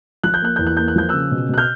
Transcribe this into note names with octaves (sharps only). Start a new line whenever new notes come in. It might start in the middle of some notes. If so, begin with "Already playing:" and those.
F3 F#6
G6
A#3 F#6
E2 G6
F#6
A#3 G6
F#6
F3 G6
C#3 E6 F#6
B2
B2 F#6
F6 G6